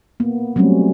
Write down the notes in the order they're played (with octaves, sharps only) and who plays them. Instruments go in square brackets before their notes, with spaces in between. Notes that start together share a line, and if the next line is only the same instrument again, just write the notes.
[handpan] A#3 B3
F#3 G3 A3 C4 C#4